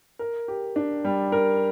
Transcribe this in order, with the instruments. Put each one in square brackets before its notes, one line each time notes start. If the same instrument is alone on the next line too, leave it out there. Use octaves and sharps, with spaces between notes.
[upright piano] A#4
G4
D4
G3
A#4